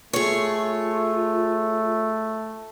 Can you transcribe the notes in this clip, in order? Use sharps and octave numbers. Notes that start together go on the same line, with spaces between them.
A3 F4 G#4 C#5